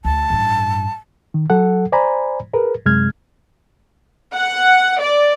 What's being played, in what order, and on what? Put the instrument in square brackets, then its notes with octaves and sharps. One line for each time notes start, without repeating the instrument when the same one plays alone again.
[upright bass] D2 [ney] A5
[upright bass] A1 G2
[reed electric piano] D#3
F#3 A4 F#5
C5 D5 G#5 A#5 B5
G#4 A#4 B4
F#2 C3 G#3 F6 G#6
[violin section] F#5
D5